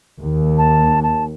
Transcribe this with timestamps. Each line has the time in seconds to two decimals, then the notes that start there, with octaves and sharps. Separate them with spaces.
0.21 D#2
0.58 A5
1.03 A5